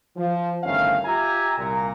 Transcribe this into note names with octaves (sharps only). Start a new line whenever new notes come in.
F3
G1 A2 D#3 C#4 E5 F5
F4 G4 E5 G#5 A#5
C2 A#2 A#5